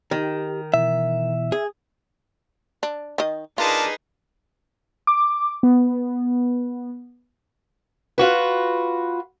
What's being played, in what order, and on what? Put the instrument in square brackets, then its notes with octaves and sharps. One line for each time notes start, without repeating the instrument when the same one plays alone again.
[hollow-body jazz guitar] D#3 [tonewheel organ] G4
[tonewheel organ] B2 E3 [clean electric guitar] E5
[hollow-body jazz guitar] G#4
[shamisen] D4
D#3 D#5
[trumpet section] D4 A#4 A5 [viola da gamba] D#4 G#4 B4 [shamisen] F4
[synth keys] D6
B3
[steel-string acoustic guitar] F4 F#4 B4